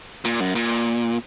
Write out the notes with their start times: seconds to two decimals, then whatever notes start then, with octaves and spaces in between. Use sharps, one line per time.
0.25 A#2
0.40 F#2
0.55 A#2